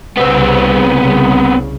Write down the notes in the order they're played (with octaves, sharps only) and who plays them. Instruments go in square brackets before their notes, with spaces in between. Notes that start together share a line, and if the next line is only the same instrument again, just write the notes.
[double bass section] C2 C#3 [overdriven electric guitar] B3 C4